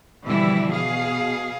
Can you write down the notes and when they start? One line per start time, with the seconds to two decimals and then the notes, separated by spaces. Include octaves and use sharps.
0.24 B2 D3 E3 F3 G3 E4
0.70 B2 G#4 F5